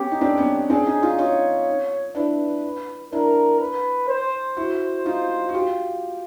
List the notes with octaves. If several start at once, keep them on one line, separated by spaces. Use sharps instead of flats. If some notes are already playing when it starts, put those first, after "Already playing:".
Already playing: B3 C#4 G4
D#4
C4 D4
B3 C#4
C4 D4 G#4
C#4 D#4
D#4 F4
D#4 F4 C#5
D4 E4 B4
D4 E4 A#4
B4
C5
E4 F#4
D#4 F4
F#4
F4 G4